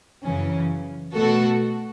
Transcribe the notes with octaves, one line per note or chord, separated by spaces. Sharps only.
F#2 C#3 E3 C#4
B2 A3 F#4 A4